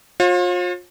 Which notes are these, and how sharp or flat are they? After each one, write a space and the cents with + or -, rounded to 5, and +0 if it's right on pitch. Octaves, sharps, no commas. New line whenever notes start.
F4 +35 C#5 -45